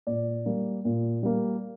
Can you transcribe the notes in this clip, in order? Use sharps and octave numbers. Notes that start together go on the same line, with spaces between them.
A#2 D5
G3 A#3
A#2
G3 A#3